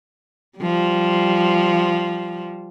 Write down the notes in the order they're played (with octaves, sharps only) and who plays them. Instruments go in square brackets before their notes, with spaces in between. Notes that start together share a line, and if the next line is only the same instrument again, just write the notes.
[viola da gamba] F3 G3